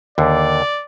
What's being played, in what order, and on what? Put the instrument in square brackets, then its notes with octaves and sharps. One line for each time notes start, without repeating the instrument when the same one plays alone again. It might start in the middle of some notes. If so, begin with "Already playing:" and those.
[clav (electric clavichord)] D#2 D3 [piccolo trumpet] D5